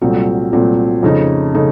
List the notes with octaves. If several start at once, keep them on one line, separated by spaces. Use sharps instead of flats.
C2 A#2 F#3 A3 C4
C2 A#2 F#3 A3 C4
F2 C#3 A3 D#4
C#3 A3 D#4